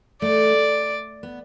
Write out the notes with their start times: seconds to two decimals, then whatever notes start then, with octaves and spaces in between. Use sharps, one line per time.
0.22 A3 D5
1.23 B3